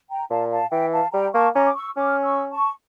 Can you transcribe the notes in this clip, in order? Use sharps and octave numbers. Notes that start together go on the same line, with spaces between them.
G5 A#5
A#2 F5 A5
F5 A5
E3 E5 G5
F5 A5
G3 G5 A#5
A#3 A5 C#6
C#4 A#5 D6
D6
C#6 E6
C#4 D6 F6
C#6 E6
A5 C#6